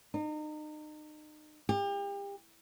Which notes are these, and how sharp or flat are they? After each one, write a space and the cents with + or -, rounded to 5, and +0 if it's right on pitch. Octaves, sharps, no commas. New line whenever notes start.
D#4 -35
G4 +35